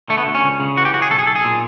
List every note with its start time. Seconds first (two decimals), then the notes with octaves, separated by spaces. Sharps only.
0.09 D3 A3
0.18 B3
0.27 D2
0.35 C#4
0.44 C#2
0.60 C#3
0.77 E3 F#4
0.85 G4
0.94 C#3 F#4
1.02 G#4
1.10 B1 A4
1.19 G#4
1.27 B1 A4
1.35 G#4
1.44 A#2